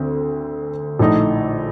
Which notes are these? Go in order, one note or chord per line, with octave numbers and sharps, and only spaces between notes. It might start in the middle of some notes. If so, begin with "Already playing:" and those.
Already playing: D2 D3 C4
A#1 A2 A3 D#4